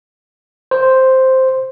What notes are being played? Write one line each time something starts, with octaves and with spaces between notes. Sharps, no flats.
C5